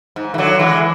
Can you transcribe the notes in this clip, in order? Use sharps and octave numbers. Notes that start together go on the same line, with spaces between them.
G#2
E3
D3 F#3
E3 G#3